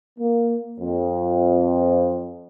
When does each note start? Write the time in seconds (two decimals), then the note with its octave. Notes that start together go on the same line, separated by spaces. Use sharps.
0.19 A#3
0.81 F2